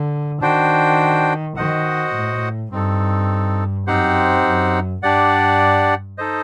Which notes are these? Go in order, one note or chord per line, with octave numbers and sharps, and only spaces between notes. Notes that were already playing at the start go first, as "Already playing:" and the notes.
Already playing: D3
D#3 D4 F#4 C5 G5
D#3 F#4 C5 D#5 F#5
A2
G2 C4 D#4 A4
F#2 C4 D#4 G4 C5 F#5
F#2
G2 D4 G4 D5 F#5
D#4 A4 C5 D#5